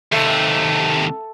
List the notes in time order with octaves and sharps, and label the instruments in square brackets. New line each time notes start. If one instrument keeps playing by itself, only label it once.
[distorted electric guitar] D#2 C3 [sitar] A3